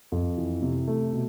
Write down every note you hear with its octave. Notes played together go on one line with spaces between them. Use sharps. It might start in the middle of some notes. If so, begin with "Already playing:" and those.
F2
E3
C3
A3
B2